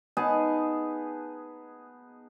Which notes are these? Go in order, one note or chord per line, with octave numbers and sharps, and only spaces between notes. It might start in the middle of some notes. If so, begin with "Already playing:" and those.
B3 D#4 G#4 A5